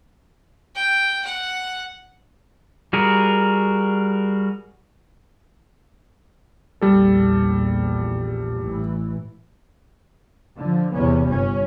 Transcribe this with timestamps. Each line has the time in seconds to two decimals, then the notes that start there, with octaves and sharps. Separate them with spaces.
0.75 G5
1.25 F#5
2.93 G3 F#4 G#4 A#4
6.81 A#1 E2 G3 A4
8.61 A1 E3
10.57 D3 F3
10.92 E2 C3 B3 C#4
11.28 G1 C#4